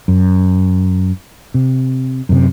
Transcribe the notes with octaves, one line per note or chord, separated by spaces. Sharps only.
F#2
C3
F#2 C3